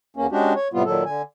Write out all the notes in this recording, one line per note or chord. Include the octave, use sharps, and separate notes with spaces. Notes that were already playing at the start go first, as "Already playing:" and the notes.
E2 A#3 C#4
G#3 C#4 D4 F#4 G4
C#5
A2 C3 G3 B3 F4
A#2 D#3 F#3 A4
D3 G#5